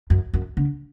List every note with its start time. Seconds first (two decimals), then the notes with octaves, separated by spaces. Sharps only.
0.10 F#2
0.34 F#2
0.57 D3